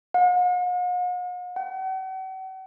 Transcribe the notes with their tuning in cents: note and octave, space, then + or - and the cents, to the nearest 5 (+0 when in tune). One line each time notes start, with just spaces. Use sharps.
F#5 -45
F#5 +45